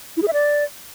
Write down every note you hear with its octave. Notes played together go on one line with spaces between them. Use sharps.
E4
G#4
E5
D5